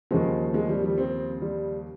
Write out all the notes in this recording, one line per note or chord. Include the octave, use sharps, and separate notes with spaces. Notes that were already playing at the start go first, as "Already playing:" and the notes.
D#2 C#3 F3 G#3
G#3
G3
G3
C4
G3